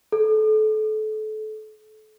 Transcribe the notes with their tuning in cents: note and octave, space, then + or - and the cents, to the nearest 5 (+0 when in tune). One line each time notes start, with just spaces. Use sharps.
A4 -30